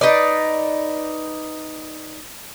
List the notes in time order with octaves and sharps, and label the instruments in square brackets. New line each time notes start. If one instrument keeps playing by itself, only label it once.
[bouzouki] D#4 B4 D5